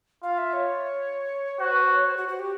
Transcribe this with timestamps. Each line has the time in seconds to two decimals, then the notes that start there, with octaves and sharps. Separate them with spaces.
0.23 F4 F5
0.38 E5
0.53 C#5
1.60 F#4 C5
1.71 B4
1.82 C5
1.94 C#5
2.06 C5
2.17 F#4
2.28 F#4
2.39 G4